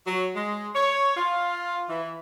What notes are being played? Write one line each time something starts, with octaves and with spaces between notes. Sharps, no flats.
F#3
G#3
C#5
F4
E3